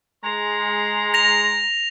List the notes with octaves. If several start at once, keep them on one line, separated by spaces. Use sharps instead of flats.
G#3 A#5 C6
A#6 F7